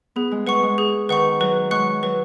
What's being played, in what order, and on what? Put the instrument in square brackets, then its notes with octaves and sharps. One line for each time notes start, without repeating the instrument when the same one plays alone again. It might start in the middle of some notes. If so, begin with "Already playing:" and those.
[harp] B3 [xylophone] G#4
[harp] G#3
[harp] G#3 [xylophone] B4 F#5 C#6
[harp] G#3
[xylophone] G#4
[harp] D#3 [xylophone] B4 F#5 C#6
[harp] F#3 [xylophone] B4
[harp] G#3 [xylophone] F#5 C#6 F#6
[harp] F#3 [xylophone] B4